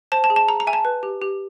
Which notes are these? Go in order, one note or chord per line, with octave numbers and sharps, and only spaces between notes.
C5 A5
A5
G#4
A5
G#4 A#5
A#5
E5 G#5
A5
B4
G4
G4